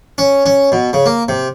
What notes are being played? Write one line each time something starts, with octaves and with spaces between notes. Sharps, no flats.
C#4
C#4
B2
C#3
A#3
C3